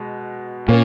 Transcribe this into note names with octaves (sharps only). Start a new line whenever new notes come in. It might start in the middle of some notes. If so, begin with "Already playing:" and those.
Already playing: B2 G#3
A#2 A#3 C#4